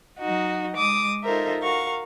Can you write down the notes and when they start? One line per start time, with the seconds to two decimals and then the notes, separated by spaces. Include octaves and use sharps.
0.18 F#3 D#4 F#4 D#5
0.76 G#3 D6 D#6
1.23 D#4 F4 A4 A#4 C5 E5
1.62 F#4 A#4 F5 C#6